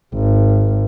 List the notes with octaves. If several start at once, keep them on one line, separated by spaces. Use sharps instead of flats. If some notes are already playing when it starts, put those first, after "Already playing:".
G#1